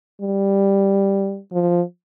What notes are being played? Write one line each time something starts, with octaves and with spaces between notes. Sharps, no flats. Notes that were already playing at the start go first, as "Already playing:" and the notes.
G3
F3